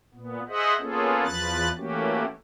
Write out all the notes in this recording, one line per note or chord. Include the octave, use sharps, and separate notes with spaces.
A#2 B3
G#4 C5 D#5 E5 F#5
A#3 B3 C#4 F4 G#4 A4
E2 F3 B4 F#6 A6
E3 A3 A#3 C#4 F#4 G4